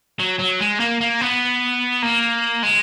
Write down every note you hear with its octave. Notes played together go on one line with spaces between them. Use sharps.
F#3
F#3
G#3
A#3
A#3
B3
A#3
G#3